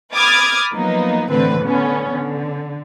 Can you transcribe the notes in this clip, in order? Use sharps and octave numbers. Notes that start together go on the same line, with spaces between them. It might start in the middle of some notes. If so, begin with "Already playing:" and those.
B5 D6 D#6 F6 G#6 A6
F3 F#3 A#3 B3 D#4
A2 D3 E3 C4 B4
D3 B3 C#4
D3